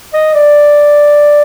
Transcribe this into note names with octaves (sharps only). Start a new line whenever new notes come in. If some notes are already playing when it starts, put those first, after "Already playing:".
D#5
D5